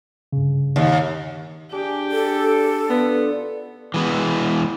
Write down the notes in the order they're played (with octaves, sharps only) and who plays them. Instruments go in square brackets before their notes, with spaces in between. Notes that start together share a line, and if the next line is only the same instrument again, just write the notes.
[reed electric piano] G2 C#3
[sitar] D#2
[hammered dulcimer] D4 G#4 [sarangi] G4
[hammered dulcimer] D4 [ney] A4
[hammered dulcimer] D3 F4 [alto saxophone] B3
[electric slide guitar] E3 G#3 B3